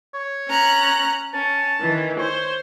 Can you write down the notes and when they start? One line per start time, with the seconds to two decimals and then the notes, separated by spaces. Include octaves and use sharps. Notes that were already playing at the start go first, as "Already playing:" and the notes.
0.14 C#5
0.48 C#4 A#5 F#6
1.34 C#4 A5
1.80 D#3 E3
2.19 C5 C#5